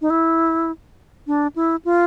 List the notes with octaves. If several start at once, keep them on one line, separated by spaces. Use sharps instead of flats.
D#4
E4
D4
E4
F4